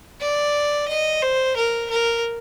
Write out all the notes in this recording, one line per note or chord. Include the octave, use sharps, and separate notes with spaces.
D5
D#5
C5
A#4
A#4